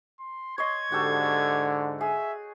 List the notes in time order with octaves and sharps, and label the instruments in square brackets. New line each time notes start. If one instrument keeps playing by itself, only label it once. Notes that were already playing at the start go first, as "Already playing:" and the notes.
[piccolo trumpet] C6
[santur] C#5 D#5 C6 [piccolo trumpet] G#6
[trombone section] G#2 D3 [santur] F#4 G4 A4
[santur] G#4 [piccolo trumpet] E5